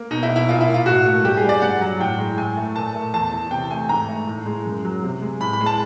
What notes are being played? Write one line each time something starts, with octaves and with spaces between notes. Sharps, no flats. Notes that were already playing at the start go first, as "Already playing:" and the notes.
Already playing: A#3
B2 D#4
E4
B2
E4
A#2 F4
E4
A#3
F4
A2 F#4
A3
G2 G4
G#4
G3
D5
G2 F#5
F#3
A2 G5
G#3
A2 G#5
A3
A#2 A5
A3
E2 A5
E3
C3 G5
A3 G#5
G#2 A#5
A3
A2
G#3
F#2
F#3
C3
G#3
A2 B5
B5
G#3
A5